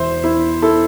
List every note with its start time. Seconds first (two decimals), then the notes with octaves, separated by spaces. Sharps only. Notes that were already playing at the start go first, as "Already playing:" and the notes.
Already playing: E1 E2 E3 C5 E5
0.24 E4
0.62 E4 A4